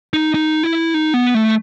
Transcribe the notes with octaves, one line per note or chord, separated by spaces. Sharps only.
D#4
D#4
E4
D#4
B3
A3